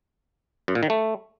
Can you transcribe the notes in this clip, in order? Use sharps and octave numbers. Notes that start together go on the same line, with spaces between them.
F#2
A#2
D#3
A3